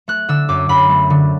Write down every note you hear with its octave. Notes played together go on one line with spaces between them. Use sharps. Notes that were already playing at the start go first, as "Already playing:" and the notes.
A3 F#6
D3 E6
F#2 D6
F#2 B5
A3
D3